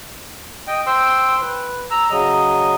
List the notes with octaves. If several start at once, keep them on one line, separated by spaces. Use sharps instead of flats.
D#5 G5
C5 G5 C6 E6
B4
A#5 E6
C#3 F#3 D#5